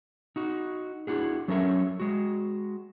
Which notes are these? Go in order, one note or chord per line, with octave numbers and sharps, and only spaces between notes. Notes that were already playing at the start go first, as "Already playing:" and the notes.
D#4 F#4
D4 E4 F#4 G#4
F#3 C#4 A4 A#4 C#5 E5
G#3 F#4